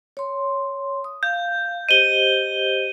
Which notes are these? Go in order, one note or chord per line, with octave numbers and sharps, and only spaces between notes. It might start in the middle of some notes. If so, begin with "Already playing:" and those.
C#5 C6
D#6
F5 G6
G4 C5 D#5 D#7 G7